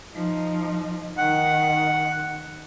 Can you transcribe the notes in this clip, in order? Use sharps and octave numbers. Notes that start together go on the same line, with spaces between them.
F3 D#4
D#3 F#5